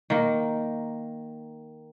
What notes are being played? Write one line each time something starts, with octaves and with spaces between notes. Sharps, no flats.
D#3 A#3